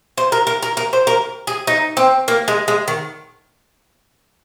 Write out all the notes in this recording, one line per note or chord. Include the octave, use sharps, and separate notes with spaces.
C5
A#4
A#4
A#4
A#4
C5
A#4
G#4
D#4
C4
A#3
G#3
G#3
D#3